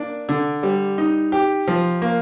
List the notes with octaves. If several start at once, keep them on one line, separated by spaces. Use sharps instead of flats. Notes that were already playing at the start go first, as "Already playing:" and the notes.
Already playing: A#3 D4
D3
G3
D#4
G4
F3
A#3